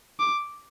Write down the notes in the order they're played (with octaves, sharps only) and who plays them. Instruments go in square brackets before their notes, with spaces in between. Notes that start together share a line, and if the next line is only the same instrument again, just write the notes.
[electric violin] D6